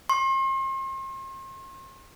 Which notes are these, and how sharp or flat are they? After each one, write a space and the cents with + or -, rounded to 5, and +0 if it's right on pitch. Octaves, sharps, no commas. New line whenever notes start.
C6 +40